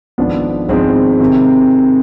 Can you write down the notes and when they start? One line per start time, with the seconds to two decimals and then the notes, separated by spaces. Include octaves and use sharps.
0.18 G#1 G#2 F3 B3 D4
0.68 G#1 G#2 F3 G#3 C4
1.20 C3 D#3